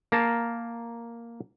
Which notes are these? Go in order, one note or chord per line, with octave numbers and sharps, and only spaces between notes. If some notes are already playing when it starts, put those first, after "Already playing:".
A#3 A#4 A5